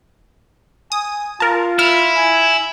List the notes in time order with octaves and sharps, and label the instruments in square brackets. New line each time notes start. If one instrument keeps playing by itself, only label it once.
[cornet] G#5 [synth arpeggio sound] D#6
[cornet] F4 [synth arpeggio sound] A#4 A5
[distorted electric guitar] E4 [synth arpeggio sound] F6
[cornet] G#5